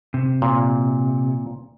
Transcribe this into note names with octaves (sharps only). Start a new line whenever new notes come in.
C3
A#2